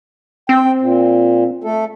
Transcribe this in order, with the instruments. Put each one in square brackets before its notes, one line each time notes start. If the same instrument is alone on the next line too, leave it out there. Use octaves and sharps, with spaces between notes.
[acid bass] C4 [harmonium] G5
[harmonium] A#2
A3 A4